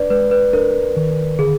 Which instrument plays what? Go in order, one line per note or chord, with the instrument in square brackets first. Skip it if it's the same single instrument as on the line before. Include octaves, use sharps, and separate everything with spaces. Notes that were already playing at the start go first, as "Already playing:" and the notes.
Already playing: [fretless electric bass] D4 [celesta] B4 D5
[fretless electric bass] G#3 [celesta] B4
[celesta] B4
[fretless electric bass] D4 [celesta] A#4
[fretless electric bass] D#3
[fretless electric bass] D3 [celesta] G#4